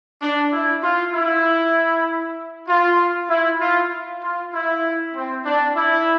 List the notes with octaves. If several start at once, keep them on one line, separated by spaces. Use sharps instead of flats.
D4
E4
F4
E4
F4
E4
F4
F4
E4
C4
D4
E4